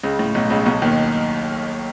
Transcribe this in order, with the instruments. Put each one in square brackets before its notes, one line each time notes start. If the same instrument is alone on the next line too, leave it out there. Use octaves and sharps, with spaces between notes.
[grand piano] C#2 C#3
A2
B1 B2
C#2 C#3
B1 B2
D#2 D#3